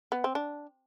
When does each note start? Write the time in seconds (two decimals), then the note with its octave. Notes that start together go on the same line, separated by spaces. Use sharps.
0.12 B3
0.24 C4
0.35 D4